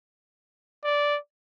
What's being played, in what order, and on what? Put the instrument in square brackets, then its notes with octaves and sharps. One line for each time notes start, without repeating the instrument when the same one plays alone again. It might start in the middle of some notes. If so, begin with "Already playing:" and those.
[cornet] D5